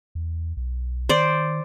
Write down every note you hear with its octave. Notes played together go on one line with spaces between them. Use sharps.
E2
B1
D#3 C5 D5